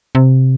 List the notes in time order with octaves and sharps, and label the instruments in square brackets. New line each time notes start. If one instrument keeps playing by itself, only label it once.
[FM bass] C3